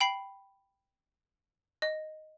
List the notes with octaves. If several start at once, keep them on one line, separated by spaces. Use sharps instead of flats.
G5 B5 C7
D#5